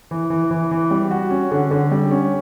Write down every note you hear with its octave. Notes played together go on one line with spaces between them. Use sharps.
E3
E3
E3
E3
G3
F#4
C#4
D3
D3
G3
C#4